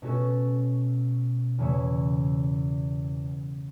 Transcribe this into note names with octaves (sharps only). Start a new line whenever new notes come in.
B2 A3 C#4 F#4 A4
E2 C#3 A3 F#4 C#5